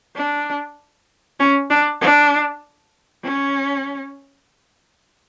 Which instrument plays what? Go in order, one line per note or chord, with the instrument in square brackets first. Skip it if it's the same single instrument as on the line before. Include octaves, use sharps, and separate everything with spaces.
[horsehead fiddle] D4
C#4
D4
D4
C#4